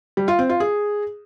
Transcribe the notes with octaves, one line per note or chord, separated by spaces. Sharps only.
G3
F4
C4
F4
G#4